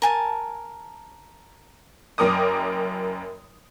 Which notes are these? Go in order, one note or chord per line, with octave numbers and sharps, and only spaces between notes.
A#4 G#5 A5
F#1 F#2 A#4 G5 D6 D#6